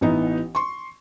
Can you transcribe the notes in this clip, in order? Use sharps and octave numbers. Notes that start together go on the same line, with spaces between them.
A1 E3 B3 D#4
C6 C#6